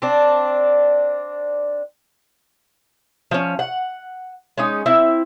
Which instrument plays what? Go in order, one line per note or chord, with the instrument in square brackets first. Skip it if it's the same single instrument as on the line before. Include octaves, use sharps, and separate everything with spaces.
[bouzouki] C4 D4
F3 C#4
F#5
G#3 C#4 D#4
C4 E4